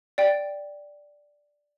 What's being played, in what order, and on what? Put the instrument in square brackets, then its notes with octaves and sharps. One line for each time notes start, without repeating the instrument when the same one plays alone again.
[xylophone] D5 G5